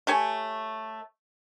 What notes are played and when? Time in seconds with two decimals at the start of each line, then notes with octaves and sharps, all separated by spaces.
0.07 A3 G4 C#5 G#5